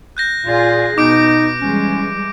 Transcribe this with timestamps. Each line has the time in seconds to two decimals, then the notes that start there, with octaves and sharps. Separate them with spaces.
0.17 F#6 G6 A#6
0.46 A#2 F4 G#4
0.98 B2 D#4 D6 D7
1.61 E3 G3 G#3 C#4